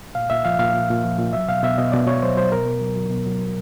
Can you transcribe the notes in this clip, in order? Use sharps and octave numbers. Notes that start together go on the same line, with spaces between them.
A#2 F5
A#2 E5
F3 F5
A#2 F5
A#2
A#2
F3
A#2
F#3 E5
B2 F5
B2 E5
B2 D#5
B2 D5
B2 C#5
F#3 C5
F#3 C5
B2 A#4
B2
F#3
F#3
B2
F#3
B2